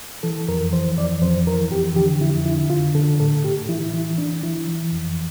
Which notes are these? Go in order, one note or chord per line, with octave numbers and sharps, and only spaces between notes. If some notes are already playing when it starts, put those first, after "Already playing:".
E3 A4
F2 A#4
E3 C5
F2 D5
F2 C5
E3 A#4
F2 G4
D3 G4
F2 E4
D3 E4
D3 F4
D3 A4
A2 A4
A2 G4
E3 E4
E3 E4
E3 D4
E3 E4
E3
F2